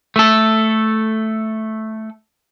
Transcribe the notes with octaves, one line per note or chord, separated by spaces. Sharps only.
A3 A4